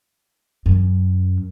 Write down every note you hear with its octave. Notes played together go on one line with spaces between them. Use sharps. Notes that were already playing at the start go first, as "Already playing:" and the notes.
F#2